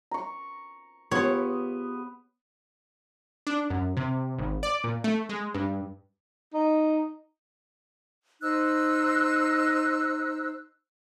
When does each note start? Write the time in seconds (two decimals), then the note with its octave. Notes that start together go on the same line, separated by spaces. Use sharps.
0.11 A#5 C#6
1.11 B3 F4 G4 G#4 C#5
3.47 D4
3.70 F#2
3.97 C3
4.39 G#1
4.63 D5
4.84 A#2
5.04 A3
5.29 G#3
5.55 G2
6.54 D#4
8.42 D#4 C5 E6 F#6